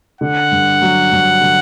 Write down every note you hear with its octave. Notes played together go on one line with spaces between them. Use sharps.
D3 F#5
G2
F#3
G2
D3